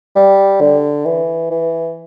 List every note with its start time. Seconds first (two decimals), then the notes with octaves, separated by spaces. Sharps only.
0.16 G3
0.60 D3
1.05 E3
1.51 E3